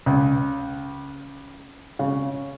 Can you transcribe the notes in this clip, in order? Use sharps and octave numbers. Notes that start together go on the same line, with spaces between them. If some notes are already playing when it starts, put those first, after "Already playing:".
C#2
C#3